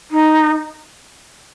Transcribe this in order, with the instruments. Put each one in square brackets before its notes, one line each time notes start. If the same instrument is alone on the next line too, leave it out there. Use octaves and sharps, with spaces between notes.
[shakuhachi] D#4